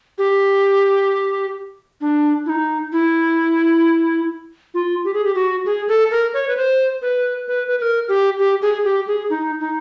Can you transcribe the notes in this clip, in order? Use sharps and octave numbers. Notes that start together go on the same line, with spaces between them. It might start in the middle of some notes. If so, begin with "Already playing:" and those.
G4
D4
E4
D#4
E4
F4
G4
G#4
G4
F#4
G#4
A4
A#4
C#5
B4
C5
B4
B4
B4
B4
A#4
G4
G4
G#4
G4
G#4
D#4
D#4